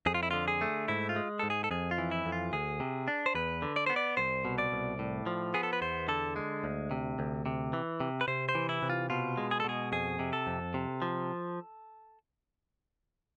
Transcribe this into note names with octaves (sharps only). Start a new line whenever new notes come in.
F2 G#4
F4
E4
D3 F4
G#4
A3
G#2 E4
F4
G#3
G#2 A4
G#4
A4
F2 G#4
F4
E3
E4
F2
F4
D2 G#4
C3
D4
C5
E2 B4
D3
D5
B3 C5
D5
C2 C5
B2
D5
C2
A2
F3
B3 G#4
A4
B4
E2 C5
D3 A4
G#3
D2
C3
D2
C3
E3
C3
B4
C3 C5
C5
E3
E4
C3
F4
B2 F4
G#3
G#4
A4
B2 G#4
F2 G#4
C3
A4
F2
C3
F3